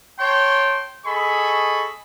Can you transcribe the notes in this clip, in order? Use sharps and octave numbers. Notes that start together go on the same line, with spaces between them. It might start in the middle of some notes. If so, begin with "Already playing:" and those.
C#5 G5 A5 C6
G#4 A4 D#5 B5 C#6